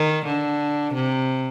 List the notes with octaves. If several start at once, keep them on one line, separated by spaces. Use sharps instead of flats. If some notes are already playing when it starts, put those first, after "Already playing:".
Already playing: D#3
D3
C3